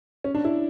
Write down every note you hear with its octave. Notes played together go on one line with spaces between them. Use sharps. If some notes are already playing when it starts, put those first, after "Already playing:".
C#4
D4
E4